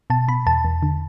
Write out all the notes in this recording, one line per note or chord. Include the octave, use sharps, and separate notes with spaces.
B2 A5
B2 B5
E2 A5
E2
D3